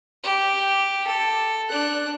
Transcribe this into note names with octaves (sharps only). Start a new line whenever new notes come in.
G4
A4
D4 F#6